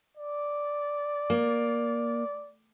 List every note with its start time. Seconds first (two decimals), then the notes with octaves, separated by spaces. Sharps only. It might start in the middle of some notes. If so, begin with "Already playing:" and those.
0.17 D5
1.30 A#3